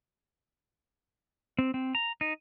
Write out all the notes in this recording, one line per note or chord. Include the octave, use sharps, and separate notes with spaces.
C4
C4
A#5
D#4